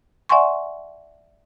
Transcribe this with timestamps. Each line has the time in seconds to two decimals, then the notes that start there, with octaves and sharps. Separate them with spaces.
0.29 D5 E5 F#5 G#5 C6 C#6